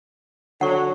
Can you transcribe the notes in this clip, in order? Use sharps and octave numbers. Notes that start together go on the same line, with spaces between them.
D3 F#3 F#5 C#6